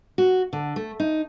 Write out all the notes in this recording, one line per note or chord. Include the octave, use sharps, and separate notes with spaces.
F#4
D3
A3
D#4